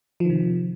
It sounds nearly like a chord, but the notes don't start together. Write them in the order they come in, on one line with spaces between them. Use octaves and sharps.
F3 D#3 C3